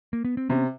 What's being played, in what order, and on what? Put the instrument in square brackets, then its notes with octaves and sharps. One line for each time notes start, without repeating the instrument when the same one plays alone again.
[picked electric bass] A#3
B3
C4
[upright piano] C3 [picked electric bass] B3 C#4